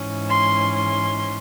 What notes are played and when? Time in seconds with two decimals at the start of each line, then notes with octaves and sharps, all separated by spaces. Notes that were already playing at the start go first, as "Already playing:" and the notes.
Already playing: G#2 E3 G#3 C#4
0.27 C6
0.75 C6